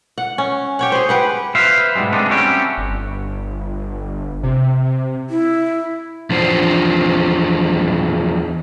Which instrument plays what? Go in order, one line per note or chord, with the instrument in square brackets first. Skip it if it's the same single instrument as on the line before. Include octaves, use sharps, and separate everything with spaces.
[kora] F#5
C#4
G4 C#5 F#5
G#4 C5
G4 B4 F#5
[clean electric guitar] B4 C5 E5 F5
G#2 B2 D#3 G3 G#3
G#3 A3 B3 C4 D4 D#4
G3 A3 C4 C#4 F#4 G4
[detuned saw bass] G1
C3
[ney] E4
[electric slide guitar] E2 F3 D4 C5